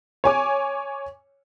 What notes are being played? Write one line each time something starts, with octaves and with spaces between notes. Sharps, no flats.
C#5 G#5 D6